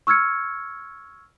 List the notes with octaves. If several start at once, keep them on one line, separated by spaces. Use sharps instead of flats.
C#6 E6 F6 G#6 C#7